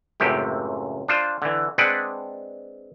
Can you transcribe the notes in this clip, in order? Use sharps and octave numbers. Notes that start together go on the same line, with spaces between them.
C#2 F#2 A2 C3 G4
D4 F4 C5
D3 E3
G#3 C4 D4 B4 D5 F#5